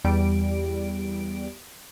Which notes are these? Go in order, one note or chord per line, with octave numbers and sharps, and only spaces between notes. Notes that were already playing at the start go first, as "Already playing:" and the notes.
E2 G3 D7